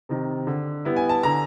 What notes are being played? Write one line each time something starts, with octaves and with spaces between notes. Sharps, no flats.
C3 D#3
D3
G3 B3 E4
G#5
A5
D3 A#5